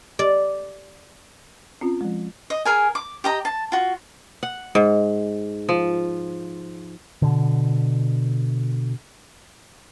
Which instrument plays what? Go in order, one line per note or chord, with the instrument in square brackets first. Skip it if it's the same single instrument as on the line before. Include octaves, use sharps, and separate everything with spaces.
[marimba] G4 D#5 [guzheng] D5
[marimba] C4 C#4 F4
F3 G#3
[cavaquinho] D#5
G#4 A#4 G#5
D6
G4 D#5 A#5
A5
F4 F#4
[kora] F#5
G#2
F3
[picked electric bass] B2 D3